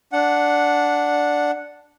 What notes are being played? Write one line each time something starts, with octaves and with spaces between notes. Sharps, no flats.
D4 F#5